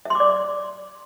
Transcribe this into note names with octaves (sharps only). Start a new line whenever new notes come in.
D5 E5 C6 D6